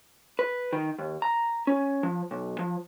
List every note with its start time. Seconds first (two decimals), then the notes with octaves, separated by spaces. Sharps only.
0.39 B4
0.73 D#3
0.99 D#2
1.22 A#5
1.67 C#4
2.03 F3
2.31 B1
2.59 F3